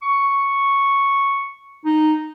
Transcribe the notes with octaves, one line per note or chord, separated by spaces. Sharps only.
C#6
D#4